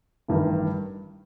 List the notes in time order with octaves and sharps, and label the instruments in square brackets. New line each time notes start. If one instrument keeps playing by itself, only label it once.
[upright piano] A1 G2 D#3